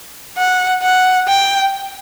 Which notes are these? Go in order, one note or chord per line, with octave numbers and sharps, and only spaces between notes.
F#5
F#5
G5